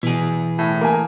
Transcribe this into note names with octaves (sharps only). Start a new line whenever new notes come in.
B2 E3 G#4
A2
A#3 G#5